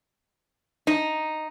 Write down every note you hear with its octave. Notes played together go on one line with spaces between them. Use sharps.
D#4